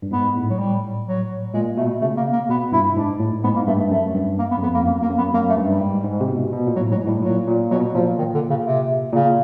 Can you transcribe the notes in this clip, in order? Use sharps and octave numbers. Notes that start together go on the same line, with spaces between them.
G2
G#2 B3
A2
F#3
G3
F#3
A#2 G#3
B2 A3
C#3 A3
A#3
A#3
B2 B3
G2 E4
G#2 D4
A2
G#2 B3
A#3
G2 A3
A3
F#2 A3
G2
A#3
B3
F#2
F2 B3
A#3
F#2 A#3
A#3
F#2
B3
F#2 A#3
A3
G2
G3
G#2
G#2
C3
B2
B2
A#2
A2 F#3
G#2 F#3
A2 G3
A#2 F#3
A#2
B2 F#3
A#2 F3
D#3
D3
C#3
C3
A#2 C#3